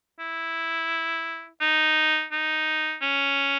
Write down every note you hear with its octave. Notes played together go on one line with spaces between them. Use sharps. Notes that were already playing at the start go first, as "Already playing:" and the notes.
E4
D#4
D#4
C#4